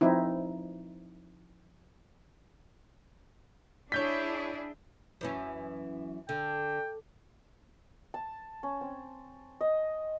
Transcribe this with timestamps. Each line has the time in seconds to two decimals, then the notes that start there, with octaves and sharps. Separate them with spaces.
0.01 F3 C4 D#4 E4
3.92 D4 E4 G#4 C#5 G6 B6
5.21 F#2 E3 C#4
6.29 D3 G5
8.14 A5
8.63 C#4
8.81 C4
9.61 D#5